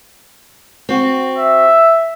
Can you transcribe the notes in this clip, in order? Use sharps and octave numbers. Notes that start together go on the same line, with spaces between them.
C4 F#4
E5